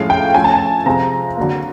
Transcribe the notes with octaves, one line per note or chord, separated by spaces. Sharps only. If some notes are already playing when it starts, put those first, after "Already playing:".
Already playing: A2 F3 G#3 C#4 F5
G5
F3 A3 C#4 G#5
A5
G#5
C3 F3 G#3 C4 A#5
D3 F#3 A#3